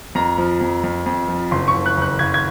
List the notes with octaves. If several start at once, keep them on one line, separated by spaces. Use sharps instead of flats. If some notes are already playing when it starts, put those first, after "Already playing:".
F2 A#5
F3
F2
F2
F2
F3
F#1 C6
C#6
F#1
F#6
F#1 F#6
F#1 G#6
G#6